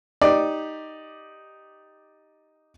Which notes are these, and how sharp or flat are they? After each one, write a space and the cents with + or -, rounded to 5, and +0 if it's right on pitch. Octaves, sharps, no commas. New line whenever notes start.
D#4 +0 G4 +0 D5 +5